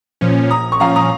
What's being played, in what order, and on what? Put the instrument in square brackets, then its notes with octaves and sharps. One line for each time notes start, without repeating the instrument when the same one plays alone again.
[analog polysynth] A#2 F3 C#4
[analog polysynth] A#1 [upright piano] A#5 D#6
[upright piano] C#6
[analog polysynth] A#2 F3 C#4 [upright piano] F5 A#5
[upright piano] A#5 D#6